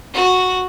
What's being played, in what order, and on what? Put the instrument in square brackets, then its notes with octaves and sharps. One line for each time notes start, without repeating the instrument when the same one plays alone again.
[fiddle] F#4